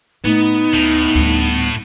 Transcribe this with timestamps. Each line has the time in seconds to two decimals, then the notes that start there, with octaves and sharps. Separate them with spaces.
0.24 A2 A3 B3 D#4
0.74 D2 A2
1.15 D2 G3